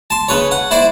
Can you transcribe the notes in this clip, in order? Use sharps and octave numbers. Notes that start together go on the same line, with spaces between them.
A5 C6
C#3 B4 C#5
F#5
E4 C5 D5